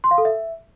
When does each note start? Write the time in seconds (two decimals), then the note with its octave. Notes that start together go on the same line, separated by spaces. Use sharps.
0.04 C6
0.11 F5
0.18 A4
0.25 E5